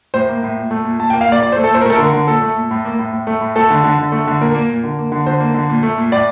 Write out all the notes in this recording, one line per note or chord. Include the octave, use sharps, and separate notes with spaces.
A2 C5
A#3
A2
A#2
A3
A#2
A#2 A5
A#3 G5
F5
A#2 D5
A#2 D5
A3 C5
A4
A#2 C5
A#4
A3 A4
D3 A#4
D3
A#2 A4
A3
A#2
A2
A#3
A2
A2
A3
A2
A3 A4
D3
D3
D3
A3
D3
A#2 A#4
A#3
A#2
D3
A#3
D3
D3 C5
A#3
D3
A#2
A3
A#2
A2 D5